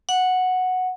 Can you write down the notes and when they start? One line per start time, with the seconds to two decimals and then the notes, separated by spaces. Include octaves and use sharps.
0.09 F#5